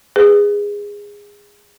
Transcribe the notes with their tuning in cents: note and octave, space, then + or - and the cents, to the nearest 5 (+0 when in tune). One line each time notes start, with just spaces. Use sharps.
G#4 -20 B4 +20